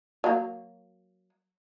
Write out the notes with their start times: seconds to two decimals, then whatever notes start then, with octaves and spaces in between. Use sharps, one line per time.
0.24 F#3 A#3